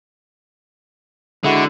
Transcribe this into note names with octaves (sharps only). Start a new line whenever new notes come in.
D3 G#3 E4 F#4